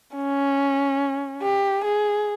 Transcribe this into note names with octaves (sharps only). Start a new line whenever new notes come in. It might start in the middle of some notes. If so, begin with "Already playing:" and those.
C#4
G4
G#4